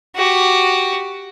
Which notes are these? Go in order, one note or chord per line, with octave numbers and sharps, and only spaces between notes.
F#4 G4